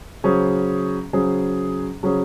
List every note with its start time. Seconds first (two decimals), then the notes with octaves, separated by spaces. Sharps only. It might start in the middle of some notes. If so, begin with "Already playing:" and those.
0.24 C#3 F#3 C#4 G#4 C5
1.13 C#3 F#3 C#4 G#4 C5
2.03 C#3 F#3 C#4 G#4 C5